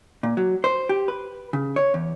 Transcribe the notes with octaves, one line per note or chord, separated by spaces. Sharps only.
A#2
F#3
C5
G4
B4
C#3
C#5
E2